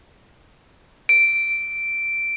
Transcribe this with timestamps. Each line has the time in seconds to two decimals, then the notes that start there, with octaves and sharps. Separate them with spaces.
1.09 D7